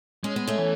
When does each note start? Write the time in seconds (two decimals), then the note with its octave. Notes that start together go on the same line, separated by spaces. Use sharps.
0.24 G#3 C#4
0.36 B3
0.47 A3 C#4
0.58 E3